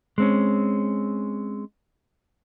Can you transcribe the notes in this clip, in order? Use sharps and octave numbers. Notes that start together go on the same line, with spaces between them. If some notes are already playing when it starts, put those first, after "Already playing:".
G#3 C4 C#4